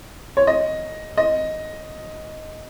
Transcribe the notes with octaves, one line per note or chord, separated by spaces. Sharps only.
C#5
D#5
D#5